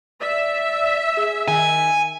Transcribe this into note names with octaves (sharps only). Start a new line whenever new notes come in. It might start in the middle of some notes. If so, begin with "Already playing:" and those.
D5 E5
G#4
D#3 G#5